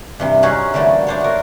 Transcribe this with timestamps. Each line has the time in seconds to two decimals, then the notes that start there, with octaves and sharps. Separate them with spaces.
0.20 G2 C3 E3
0.43 C#4 D#4 F4 F#4 G#4
0.74 D3 E3 G3 A3 A#3
1.07 D4 C5 C#5
1.20 F#4 A#4